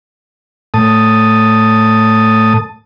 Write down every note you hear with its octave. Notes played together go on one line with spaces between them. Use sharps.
A2 A5 D#6